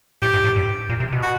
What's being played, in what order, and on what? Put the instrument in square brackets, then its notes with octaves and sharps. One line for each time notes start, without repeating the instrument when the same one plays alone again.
[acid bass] A2 [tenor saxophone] G4
[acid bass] G#2
A2
G2
A#2
C3
B2
[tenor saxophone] F#4